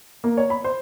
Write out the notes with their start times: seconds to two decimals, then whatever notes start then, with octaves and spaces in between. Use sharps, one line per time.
0.24 A#3
0.37 C#5
0.50 B5
0.64 C5